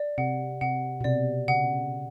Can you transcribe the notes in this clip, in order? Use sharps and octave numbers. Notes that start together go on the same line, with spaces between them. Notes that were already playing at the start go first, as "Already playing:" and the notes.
Already playing: D5
C3 F#5
C3 F#5
B2
C3 D5
C#3 F#5